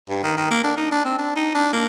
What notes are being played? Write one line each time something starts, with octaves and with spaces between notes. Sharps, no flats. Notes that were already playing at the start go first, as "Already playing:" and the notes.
G2
D#3
D#3
A#3
D4
D#4
D4
C4
D4
D#4
D4
A#3